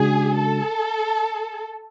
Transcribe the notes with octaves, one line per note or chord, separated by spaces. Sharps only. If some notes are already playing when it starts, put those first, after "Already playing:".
Already playing: C#3 G#3 D4 F#4 G#4
A4